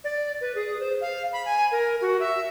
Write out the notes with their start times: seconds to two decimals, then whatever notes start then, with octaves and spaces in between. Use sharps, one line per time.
0.04 D5
0.41 B4
0.55 G#4
0.80 C5
1.01 F5
1.33 B5
1.46 G#5
1.72 A#4
2.01 F#4
2.20 E5